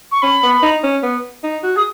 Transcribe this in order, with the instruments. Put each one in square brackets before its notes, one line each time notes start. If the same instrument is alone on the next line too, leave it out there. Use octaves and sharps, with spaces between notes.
[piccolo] C#6
[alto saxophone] C#4 [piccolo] B5
[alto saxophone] B3
D#4
C#4
B3
D#4
F#4
[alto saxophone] G#4 [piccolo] D#6